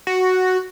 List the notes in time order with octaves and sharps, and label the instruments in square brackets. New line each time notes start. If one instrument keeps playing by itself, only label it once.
[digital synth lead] F#4